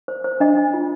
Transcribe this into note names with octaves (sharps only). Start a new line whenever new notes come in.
C5
C5
D4 D#5
D4
F4